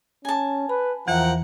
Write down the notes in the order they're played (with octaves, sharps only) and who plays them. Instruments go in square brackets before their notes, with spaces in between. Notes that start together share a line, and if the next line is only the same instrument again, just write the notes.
[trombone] C#4 [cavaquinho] G#5 A5
[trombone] B4 [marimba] B5
[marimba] E2 E3 E5 [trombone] F3 [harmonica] A#4 F#5 G5